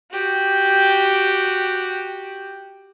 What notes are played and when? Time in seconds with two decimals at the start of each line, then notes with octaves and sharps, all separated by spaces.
0.12 F#4 G4